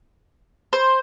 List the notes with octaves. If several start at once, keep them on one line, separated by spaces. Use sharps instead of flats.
C5